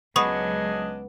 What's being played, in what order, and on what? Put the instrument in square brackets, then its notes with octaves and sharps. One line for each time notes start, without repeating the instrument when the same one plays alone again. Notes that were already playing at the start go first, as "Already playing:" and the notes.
[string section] C#2 F#3 [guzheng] B3 [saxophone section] D4 G#4 D#5 [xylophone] C#6 D#6